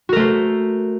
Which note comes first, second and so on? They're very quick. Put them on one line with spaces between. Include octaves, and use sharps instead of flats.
F#4 A#4 A3 C5